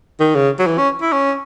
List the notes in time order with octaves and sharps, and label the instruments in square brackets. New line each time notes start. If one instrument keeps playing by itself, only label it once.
[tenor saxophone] D#3
C#3
F#3
E3
C#4
E4
C#4